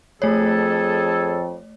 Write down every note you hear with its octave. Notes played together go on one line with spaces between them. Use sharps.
F2 A3 G#4 A4 C#5